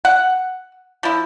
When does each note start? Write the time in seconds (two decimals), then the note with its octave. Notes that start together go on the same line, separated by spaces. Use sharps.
0.05 F#5
1.03 F3 E4